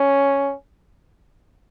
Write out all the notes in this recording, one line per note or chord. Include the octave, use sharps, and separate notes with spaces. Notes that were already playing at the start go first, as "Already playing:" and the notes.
Already playing: C#4